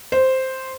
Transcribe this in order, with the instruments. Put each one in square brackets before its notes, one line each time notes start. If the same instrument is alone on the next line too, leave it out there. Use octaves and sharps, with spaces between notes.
[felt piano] C5